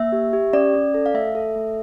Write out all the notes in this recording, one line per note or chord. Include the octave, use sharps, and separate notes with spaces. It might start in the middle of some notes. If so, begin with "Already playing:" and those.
Already playing: A#3 E5
G4
G4
C#4 D5
C#4
A4
F5
A3 E5
A4
A3